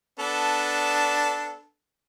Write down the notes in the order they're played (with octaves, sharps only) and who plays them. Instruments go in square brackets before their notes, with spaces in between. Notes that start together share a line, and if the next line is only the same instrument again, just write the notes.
[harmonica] B3 D4 A4